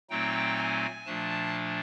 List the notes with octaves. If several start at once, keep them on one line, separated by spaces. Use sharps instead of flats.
A#2 F#3 A3 C4 D#4 G5
G#5
A#2 F3 A3 D4 A5